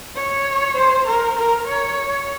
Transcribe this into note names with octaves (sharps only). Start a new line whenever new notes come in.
C#5
C5
A#4
A#4
C#5